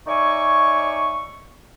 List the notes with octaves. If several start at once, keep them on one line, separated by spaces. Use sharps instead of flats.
D#4 C#5 D5 E5 G#5 C#6